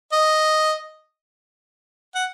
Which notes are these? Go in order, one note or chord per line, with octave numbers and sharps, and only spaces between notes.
D#5
F#5